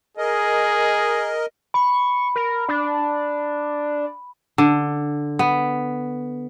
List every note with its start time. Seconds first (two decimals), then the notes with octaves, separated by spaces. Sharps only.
0.17 G#4 A#4 D#5
1.74 B5 C#6
2.35 A#4
2.69 D4
4.58 D3
5.39 B3